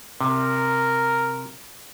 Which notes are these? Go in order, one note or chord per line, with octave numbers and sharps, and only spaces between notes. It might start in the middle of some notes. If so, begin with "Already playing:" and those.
C3 A#4